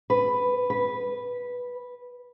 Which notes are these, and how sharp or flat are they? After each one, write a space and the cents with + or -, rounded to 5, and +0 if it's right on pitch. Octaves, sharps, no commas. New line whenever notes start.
B4 +5
B4 -10